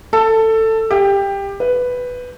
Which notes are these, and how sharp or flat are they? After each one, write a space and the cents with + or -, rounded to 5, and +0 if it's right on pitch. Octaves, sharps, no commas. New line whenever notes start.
A4 +15
G4 +15
B4 +5